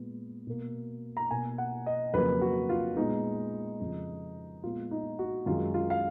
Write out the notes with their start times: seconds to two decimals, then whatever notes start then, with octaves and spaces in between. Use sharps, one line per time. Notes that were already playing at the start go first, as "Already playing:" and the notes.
Already playing: A#2 G#3 B3
0.47 B2 A#3
1.17 A#5
1.30 B2 A#3 G#5
1.58 F#5
1.86 D#5
2.14 F2 C#3 F#3 A#3 B4
2.41 F#4
2.69 F4
2.96 A#2 G#3 B3 D#4
3.81 F2 C#3 F3 G#3
4.63 A#2 G#3 B3 F4
4.91 D#4
5.19 F#4
5.46 F#2 D#3 G#3 F4
5.74 F4
5.90 F5